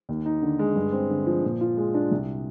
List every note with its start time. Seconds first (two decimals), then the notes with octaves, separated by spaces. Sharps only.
0.09 D#2
0.25 D#4
0.42 D3
0.59 G#3
0.76 G2
0.93 C4
1.10 D3
1.26 F3
1.44 A#2
1.61 F4
1.77 G#3
1.94 D4
2.11 C2